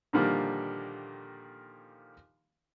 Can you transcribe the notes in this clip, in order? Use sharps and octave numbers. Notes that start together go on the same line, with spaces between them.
A#2 D3 D#3 F3 G3 A#3